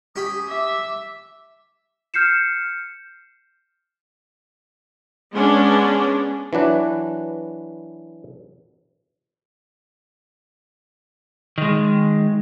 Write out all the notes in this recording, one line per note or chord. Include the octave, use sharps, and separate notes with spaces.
C#4 G4 B5 D#6
E5 D6
F6 G6 C7 C#7 E7
G#3 B3 C#4 D4
E3 F#3 D4 B4
D#3 G#3